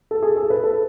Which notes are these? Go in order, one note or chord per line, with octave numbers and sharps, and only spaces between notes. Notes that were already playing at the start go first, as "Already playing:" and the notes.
A4
G#4
A4
B4
A4